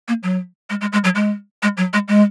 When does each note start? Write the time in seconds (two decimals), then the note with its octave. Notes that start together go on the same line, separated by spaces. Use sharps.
0.08 A#3
0.23 F#3
0.70 G#3
0.81 G#3
0.93 G#3
1.04 F#3
1.15 G#3
1.63 G#3
1.77 F#3
1.93 G#3
2.08 G#3